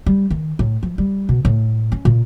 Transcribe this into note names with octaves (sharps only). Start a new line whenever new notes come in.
G3
D#3
A2
F3
G3
B2
A2
C#4
A#2